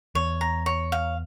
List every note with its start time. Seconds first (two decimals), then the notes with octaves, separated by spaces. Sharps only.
0.15 E2 C#5
0.41 A#5
0.66 C#5
0.92 F5